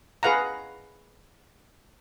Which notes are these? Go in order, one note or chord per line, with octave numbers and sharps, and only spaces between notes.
G#4 B4 F5 F#5 A#5